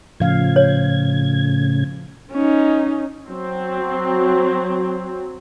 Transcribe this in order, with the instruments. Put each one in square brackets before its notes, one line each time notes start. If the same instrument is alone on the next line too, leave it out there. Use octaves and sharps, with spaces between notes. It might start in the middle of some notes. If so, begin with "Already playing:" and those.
[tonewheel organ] A2 C#3 G#6 [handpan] F3 F5
[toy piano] C#5
[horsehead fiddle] C#4 D#4
[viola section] F#3 C4